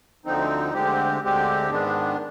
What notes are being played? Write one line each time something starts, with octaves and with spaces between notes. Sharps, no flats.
D2 D3 F3 C4 D#4
D2 D3 G#3 C4 G4
D2 D3 G#3 C4 G4
G#2 D#3 G#3 B3 D4